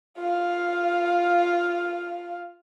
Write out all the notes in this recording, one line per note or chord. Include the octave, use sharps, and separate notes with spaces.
F4 F5